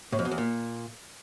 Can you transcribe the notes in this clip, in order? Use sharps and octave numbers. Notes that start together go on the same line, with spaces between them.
A2
F2
B2
E2
A#2